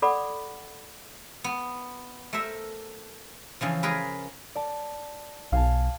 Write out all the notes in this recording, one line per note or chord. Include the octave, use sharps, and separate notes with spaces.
A4 D5 F#5 B5 D6
B3
A3 A#4 C5 E5
C#3 E3 F3
F4 G#4 A#4 B4
D5 A5
B1 F5 G#5 A5